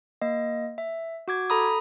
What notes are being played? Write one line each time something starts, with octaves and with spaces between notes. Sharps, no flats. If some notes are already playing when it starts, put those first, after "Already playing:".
A#3 D#5
E5
F#4 D6 G#6
A4 A#5 B5 D#6